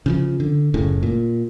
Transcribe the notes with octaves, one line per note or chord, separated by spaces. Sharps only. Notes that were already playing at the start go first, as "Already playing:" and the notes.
C#3 E3 F3
D3
F#1 A2 C#3
A#2